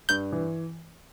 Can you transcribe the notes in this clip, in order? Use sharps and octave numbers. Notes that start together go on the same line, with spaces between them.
G2 G6
E3